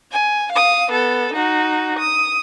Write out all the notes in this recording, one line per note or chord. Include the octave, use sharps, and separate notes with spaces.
G#5
F5 D#6
B3 A4
D#4 F#4
D#6